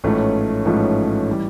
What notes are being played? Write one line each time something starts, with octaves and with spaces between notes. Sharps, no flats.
A1 G#2 F3 A3 C#4
A1 G#2 F3 A3 C#4
E3 G3